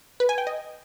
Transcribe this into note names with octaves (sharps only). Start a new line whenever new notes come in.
B4
G#5
G5
D#5